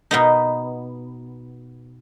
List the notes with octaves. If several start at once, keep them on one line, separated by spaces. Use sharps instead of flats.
B2 B3 D#4